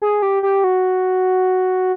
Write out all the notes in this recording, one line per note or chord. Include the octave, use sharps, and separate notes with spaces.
G#4
G4
G4
F#4